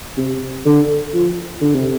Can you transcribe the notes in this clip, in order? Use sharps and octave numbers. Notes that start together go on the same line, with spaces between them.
C3
D3
F3
D3
C3